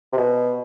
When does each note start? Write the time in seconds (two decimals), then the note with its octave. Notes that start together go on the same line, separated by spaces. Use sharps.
0.12 C3
0.17 B2